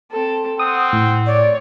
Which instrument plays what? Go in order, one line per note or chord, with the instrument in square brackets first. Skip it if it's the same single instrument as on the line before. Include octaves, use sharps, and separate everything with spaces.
[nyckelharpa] C4 A4
[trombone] C4 [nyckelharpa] F#5 [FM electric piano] D#6
[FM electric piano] A2
[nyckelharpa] C#5 [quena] D5